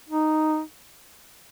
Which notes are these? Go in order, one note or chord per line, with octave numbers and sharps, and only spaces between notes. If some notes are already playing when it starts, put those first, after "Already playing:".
D#4